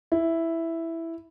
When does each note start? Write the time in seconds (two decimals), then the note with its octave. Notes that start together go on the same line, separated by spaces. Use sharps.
0.12 E4